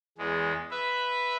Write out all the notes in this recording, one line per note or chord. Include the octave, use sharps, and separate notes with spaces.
E2 G#3
B4 E5